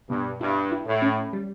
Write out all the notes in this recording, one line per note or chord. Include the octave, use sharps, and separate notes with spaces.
G2 B2
G2 E4
E4
A2
C#4
G3